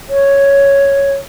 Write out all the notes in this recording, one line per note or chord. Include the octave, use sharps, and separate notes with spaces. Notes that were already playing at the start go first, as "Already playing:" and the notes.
C#5